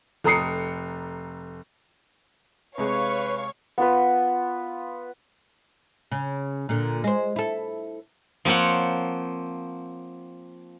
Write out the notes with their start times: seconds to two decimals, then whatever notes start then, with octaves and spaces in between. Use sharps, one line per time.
0.24 F1 A4 A#5 D#6 C7 C#7
2.78 C3 G#3 G#4 B4 C#5 F5 C#6
3.78 B3 F4 B4
6.12 C#3
6.69 A#2 D3
7.04 G#3 C5
7.36 E4 A4
8.45 F3 A#3 C4 C#5 F#5